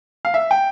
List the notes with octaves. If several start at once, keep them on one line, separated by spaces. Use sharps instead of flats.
F5
E5
G5